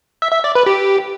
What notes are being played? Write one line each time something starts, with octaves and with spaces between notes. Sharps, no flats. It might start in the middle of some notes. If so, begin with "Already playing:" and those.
E5
E5
D5
B4
G4